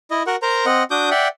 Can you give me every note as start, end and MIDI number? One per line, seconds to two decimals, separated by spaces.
0.11 0.23 64
0.11 0.23 75
0.27 0.36 66
0.27 0.36 70
0.27 0.36 78
0.42 0.66 70
0.42 0.66 72
0.42 0.66 82
0.66 0.84 60
0.66 0.84 75
0.66 0.84 78
0.91 1.10 62
0.91 1.10 66
0.91 1.10 86
0.91 1.10 87
0.91 1.10 91
1.11 1.28 74
1.11 1.28 76
1.11 1.28 78
1.11 1.28 79